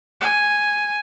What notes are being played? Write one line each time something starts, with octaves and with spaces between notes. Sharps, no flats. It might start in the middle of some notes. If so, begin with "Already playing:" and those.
G#5